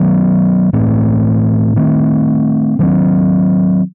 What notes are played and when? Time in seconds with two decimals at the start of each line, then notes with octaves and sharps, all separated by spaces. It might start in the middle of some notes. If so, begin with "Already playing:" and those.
Already playing: D#3 F#3 B3
0.73 A2 E3 A3 C4
1.76 D#3 A3 C4
2.79 D#3 F#3 A3 C4